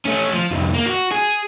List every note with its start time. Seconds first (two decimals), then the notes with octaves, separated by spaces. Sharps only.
0.05 A3 C#4
0.33 F3
0.51 C2 F2
0.74 A#3
0.86 F#4
1.12 G#4